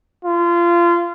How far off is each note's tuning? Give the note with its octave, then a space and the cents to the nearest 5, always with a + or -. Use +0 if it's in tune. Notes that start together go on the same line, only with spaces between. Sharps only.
F4 -25